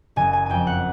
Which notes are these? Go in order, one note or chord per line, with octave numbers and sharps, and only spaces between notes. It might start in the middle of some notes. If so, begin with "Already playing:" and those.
F#1 G#5
G#5
F2 G5 G#5
F#5